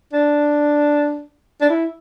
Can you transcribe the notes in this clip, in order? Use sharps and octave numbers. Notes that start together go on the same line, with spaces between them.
D4
D4
E4